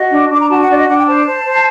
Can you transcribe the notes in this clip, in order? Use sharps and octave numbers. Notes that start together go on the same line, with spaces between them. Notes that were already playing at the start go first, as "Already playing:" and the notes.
Already playing: F#4 D#5
D4
D4 D6
A#5
F#4 A5
F#5
D4 D5
D#5
D4 F#5
G5
C5 A5
C5
C5